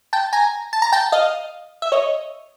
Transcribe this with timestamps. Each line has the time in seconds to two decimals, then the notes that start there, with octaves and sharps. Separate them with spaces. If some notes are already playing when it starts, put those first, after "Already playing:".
0.13 G5 A5
0.33 G#5 A#5
0.73 A5
0.82 A#5
0.92 G5 A5
1.12 D#5 F5
1.82 E5
1.92 C#5 D#5